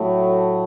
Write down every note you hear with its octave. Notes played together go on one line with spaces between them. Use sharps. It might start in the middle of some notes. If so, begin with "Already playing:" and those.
Already playing: A2 F#3 A3